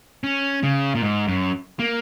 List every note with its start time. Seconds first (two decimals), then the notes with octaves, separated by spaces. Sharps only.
0.24 C#4
0.63 C#3
0.95 A#2
1.02 G#2
1.28 F#2
1.79 A#3